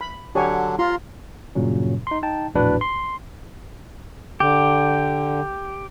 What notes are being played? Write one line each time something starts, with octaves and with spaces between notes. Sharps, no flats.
B5
D3 F#3 D4 G4 C#5 G#5
F4 A#5 C6
G2 A#2 C#3 F#3 C#4
D#4 C6
D#4 G5 A5
A#1 E2 A2 D4 F#4 B4
C6
D3 G4